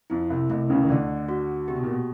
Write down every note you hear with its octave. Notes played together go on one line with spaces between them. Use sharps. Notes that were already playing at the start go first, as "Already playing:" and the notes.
F2 F3 E4
C2 C3
C2 C3 A3
C#2 C#3
D#3
D2 D3 D5
F#4
C3 G4
B2
A#2
B2